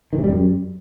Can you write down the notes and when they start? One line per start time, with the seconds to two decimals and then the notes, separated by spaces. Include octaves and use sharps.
0.13 D#3
0.18 C3
0.24 G3
0.30 F#2